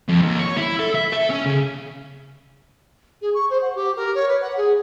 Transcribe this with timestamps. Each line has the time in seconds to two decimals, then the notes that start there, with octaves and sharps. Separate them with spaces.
0.09 F2
0.22 D#2
0.39 C#5
0.57 E4
0.80 A4
0.95 E5
1.13 A4
1.30 C#4
1.45 C#3
3.21 G#4
3.34 C#6
3.50 C5
3.62 F#5
3.75 G4
3.96 A#4
4.15 C#5
4.28 B4
4.41 F#5
4.57 G#4